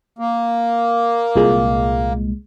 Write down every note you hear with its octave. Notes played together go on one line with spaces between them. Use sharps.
A#3
C2 A#2 G#3